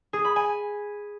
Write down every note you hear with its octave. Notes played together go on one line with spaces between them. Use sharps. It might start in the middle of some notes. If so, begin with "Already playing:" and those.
G#4
B5
G#5